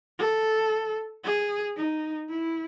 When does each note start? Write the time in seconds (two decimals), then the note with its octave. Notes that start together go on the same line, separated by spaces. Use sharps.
0.19 A4
1.25 G#4
1.77 D#4
2.29 E4